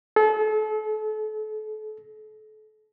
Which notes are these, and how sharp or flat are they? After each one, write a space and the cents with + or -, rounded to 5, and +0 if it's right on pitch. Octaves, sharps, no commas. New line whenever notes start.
A4 -35